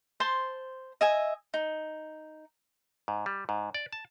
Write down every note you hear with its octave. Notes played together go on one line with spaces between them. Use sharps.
C5 A5 C6
D#5 E5 G#5
D#4
G#2
G3
G#2
D5
A5